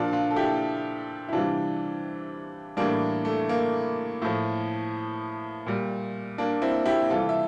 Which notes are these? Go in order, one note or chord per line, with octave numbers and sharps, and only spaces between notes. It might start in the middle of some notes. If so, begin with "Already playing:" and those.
Already playing: A#2 F3 D4 F4
D4 F4
A4
E4 G4
E4
C3 E3 G3 D4 F4
A2 E3 G3 A#3 D4
A3
A#3
A2 F3
A#2 G3
A#3 D4
C4 E4
E4 G4
C3 E3 G3 F4 A4
E5